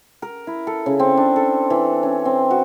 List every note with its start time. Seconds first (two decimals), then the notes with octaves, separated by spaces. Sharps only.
0.22 A#4
0.47 E4
0.67 A4
0.86 C#3
0.99 C4
1.17 D4
1.36 A4
1.70 E3
2.03 C#4
2.25 C4
2.51 F#4